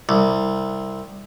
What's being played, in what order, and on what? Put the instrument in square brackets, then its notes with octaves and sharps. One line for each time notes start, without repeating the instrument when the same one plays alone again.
[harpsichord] C2